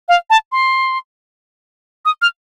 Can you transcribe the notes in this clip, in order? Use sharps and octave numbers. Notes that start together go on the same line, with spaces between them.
F5
A5
C6
D#6
F6